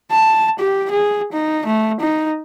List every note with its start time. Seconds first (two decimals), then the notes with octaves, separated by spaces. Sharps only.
0.12 A5
0.59 G4
0.91 G#4
1.33 D#4
1.66 A3
2.01 D#4